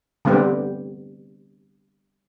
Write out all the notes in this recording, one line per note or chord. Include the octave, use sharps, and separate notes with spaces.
D3 G3 B3 C4 G4